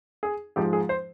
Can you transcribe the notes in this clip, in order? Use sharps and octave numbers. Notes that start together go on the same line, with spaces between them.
G#4
G#2 F3 G#3 G4
G#4
C5